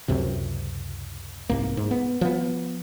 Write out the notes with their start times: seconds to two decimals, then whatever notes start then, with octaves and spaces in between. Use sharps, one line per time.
0.08 C#2 F#2 C3
1.49 C2 G#2 A#3
1.77 G#2
1.91 B3
2.21 F3 B3